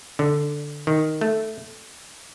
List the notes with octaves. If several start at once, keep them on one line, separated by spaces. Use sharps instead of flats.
D3
D#3
A3